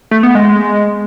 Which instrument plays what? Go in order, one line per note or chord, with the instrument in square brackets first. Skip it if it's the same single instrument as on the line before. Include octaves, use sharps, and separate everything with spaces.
[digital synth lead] A3
B3
G#3